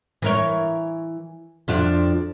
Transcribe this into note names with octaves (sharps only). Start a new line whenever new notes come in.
E3 A#4 C#5
F2 D4 F4